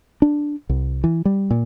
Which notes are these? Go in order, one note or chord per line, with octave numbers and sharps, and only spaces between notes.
D4
C2
E3
G3
A#2